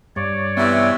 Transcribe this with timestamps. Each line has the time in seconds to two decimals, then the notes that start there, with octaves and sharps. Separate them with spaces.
0.16 G2 C#5 D5
0.57 C3 E3 B3 E5